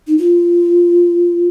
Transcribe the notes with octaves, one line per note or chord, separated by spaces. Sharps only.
D#4
F4